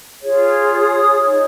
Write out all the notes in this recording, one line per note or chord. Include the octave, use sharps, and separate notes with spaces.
F4 G#4 C#5
D#6
D#4 C#5